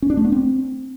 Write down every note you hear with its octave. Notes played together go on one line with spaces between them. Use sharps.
C#4
D4
A3
B3
C4